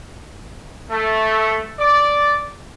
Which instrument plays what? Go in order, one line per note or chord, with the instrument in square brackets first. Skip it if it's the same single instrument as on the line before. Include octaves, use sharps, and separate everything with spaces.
[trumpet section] A3
D5